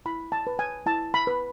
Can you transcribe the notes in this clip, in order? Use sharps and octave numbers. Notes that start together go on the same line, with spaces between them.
E4 B5
A5
B4
G#5
E4 A5
B5
B4